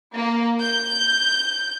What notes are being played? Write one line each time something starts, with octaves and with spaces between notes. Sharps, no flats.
A#3
G6